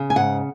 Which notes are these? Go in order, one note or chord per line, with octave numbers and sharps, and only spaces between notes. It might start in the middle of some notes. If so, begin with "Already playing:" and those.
Already playing: C#3
G#5
G#2 F#5